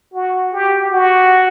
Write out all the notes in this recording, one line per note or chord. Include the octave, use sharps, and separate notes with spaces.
F#4
G4
F#4